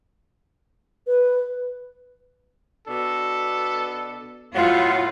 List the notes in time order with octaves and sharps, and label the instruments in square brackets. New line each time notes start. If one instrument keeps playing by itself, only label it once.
[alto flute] B4
[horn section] B2 D4 A4
[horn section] A2 F#3 B3 [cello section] F4